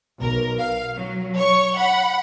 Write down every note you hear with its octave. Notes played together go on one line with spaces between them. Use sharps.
B1 A#4
F5
F#3
C#5 C#6
F#5 B5